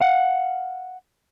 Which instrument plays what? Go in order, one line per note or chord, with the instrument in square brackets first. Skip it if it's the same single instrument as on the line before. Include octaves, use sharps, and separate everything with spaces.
[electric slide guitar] F5 F#5